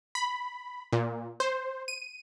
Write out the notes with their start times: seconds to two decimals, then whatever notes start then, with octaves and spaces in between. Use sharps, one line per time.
0.15 B5
0.93 A#2
1.40 C5
1.88 D#7